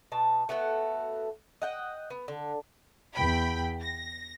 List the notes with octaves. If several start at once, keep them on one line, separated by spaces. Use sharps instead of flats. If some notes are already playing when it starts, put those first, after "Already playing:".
B2 A5
A3 B3 F#4 A4
D#5 F#5 G5
B3
D3
E2 G5 B5
A#6